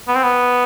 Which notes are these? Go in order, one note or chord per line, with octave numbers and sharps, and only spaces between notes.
B3
C4
B3